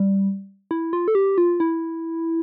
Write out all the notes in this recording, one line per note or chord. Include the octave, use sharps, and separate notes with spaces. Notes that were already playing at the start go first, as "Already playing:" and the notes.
Already playing: G3
E4
F4
A4
G4
F4
E4